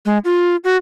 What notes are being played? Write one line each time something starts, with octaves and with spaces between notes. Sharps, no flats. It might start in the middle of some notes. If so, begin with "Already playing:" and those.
G#3
F4
F#4